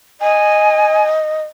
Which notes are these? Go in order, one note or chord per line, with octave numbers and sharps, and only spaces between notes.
D#5 G#5